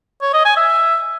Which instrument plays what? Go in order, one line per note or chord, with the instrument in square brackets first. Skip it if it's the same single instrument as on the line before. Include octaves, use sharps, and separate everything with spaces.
[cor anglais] C#5
D#5
G#5
E5